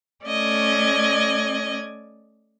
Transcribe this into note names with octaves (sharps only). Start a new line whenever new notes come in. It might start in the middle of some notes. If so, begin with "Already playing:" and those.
A3 C#4 D5 D#5 G#6